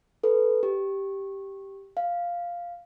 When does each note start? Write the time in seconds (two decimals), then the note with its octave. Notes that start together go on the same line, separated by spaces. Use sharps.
0.23 A4 B4
0.63 G4
1.97 F5